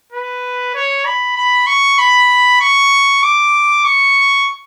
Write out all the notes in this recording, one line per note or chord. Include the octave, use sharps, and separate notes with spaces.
B4
C#5
B5
B5
C#6
B5
C#6
D6
C#6